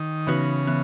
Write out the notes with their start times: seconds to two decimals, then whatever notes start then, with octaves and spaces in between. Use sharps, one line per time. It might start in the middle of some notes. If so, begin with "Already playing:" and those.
Already playing: D#3
0.27 C#3 E3 B3 D#4 F#4 B4
0.67 E3 B3